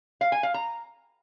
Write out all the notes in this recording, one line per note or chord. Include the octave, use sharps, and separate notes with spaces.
F5
G#5
F5
A#5